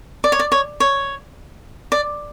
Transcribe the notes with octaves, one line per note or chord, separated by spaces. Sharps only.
D5
C#5
D5
C#5
C#5
D5